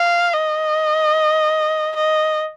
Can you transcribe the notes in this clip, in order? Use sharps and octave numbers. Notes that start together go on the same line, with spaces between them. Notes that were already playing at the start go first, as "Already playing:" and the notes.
Already playing: F5
D#5
D#5